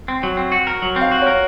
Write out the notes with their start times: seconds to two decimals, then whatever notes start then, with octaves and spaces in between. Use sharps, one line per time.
0.08 C4
0.23 F#3
0.37 C4
0.52 F#4
0.67 A#4
0.82 F#3
0.96 C4
1.01 F5
1.11 F#4
1.22 C#5
1.27 A#4